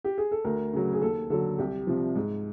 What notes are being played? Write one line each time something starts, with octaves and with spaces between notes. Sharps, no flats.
G4
G#4
A4
D2 A#4
C#3 F#3
G#4
D#2 A4
D3 F#3 A4
C2 G4
C3 F3
G#2